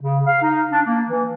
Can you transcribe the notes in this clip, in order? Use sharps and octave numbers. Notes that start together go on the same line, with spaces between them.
C#3
F5
D#4
D4
A#3
E3